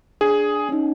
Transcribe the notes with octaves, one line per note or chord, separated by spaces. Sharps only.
D4 G#4
C#4 D#4